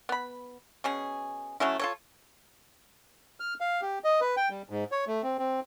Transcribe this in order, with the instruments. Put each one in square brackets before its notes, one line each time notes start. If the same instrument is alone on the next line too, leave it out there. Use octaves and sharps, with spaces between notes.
[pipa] B3 B5
B2 C#4 G#4
F#3 A3 C#4 E4
F4 A4 C#5
[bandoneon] F6
F5
G4
D#5
B4
G5
G3
G#2
C#5
A3
C4
C4